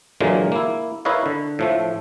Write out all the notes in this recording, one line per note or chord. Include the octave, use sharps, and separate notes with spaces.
A#2 D3 E3 F#3 G#3 A#3
A#3 E4
E4 A#4 B4 C#5 D#5 F5
D3
A2 F3 A3